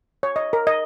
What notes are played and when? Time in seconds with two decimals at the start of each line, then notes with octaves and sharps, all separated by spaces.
0.23 C#5
0.36 D#5
0.53 A#4
0.67 D#5